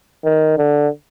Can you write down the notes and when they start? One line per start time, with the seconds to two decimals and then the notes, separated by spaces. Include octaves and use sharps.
0.25 D#3
0.58 D3